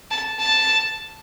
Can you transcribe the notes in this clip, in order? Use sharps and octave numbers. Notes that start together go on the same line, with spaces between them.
A5
A5